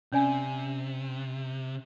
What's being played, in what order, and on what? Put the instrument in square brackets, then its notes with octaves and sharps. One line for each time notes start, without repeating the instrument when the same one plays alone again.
[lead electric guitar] C3 [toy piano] C#4 D5 G#5